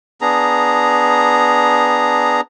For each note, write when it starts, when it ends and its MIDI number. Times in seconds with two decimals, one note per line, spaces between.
0.21 2.41 59
0.21 2.41 62
0.21 2.41 68
0.21 2.41 82